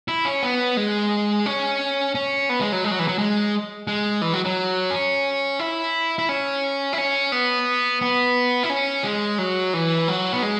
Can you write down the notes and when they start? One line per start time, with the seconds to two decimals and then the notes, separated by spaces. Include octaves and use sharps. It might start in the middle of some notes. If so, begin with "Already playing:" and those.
0.08 E4
0.25 C#4
0.43 B3
0.77 G#3
1.46 C#4
2.15 C#4
2.49 B3
2.61 G#3
2.72 F#3
2.84 G#3
2.91 F#3
2.99 E3
3.08 F#3
3.19 G#3
3.87 G#3
4.22 E3
4.33 F#3
4.45 F#3
4.91 C#4
5.59 E4
6.19 E4
6.29 C#4
6.93 E4
6.98 C#4
7.32 B3
8.02 B3
8.63 E4
8.70 C#4
9.04 G#3
9.38 F#3
9.74 E3
10.08 F#3
10.33 B3
10.42 G#3